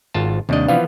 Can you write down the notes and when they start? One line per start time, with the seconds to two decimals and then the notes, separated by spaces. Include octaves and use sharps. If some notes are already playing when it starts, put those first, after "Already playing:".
0.14 G#1 F4 A5
0.49 D#2 C3 G3 D4 D#5
0.68 E3 F3 B3 F5